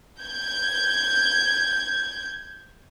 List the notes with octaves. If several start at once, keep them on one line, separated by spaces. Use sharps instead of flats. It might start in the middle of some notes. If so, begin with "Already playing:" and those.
G6 G#6